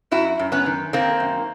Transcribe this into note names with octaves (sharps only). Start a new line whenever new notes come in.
F#2 E4 F#4
F#2
B3 C#4
D#3
D#3 A#3 C4
F#2